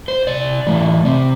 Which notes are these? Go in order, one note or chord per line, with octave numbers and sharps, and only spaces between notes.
C5
C3 D5
E3 A3
C3